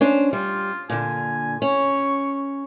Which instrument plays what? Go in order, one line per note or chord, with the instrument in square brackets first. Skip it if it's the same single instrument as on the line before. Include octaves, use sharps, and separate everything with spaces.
[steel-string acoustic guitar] C#4 D4 C5
[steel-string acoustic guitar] G3 [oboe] F4
[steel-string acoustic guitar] A#2 D3 [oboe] G#5
[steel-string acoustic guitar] C#4 [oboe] C#6